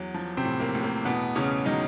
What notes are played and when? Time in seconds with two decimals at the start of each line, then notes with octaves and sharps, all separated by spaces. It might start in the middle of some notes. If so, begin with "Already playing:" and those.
Already playing: E2 F#3
0.14 F3
0.37 C3 C4
0.45 A2
0.60 A#3
0.75 A2
0.83 A#3
1.05 E2 B2 B3
1.35 E2 C#3 C#4
1.65 D#3 F#3 D#4